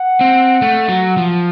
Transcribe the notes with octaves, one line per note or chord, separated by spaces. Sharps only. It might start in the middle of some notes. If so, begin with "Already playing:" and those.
Already playing: F#5
C4
A3
F#3
F3